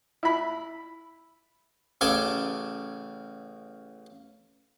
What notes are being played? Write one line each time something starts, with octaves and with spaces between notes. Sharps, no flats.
E4 B5
A1 C#3 A4 G#5 A5 D6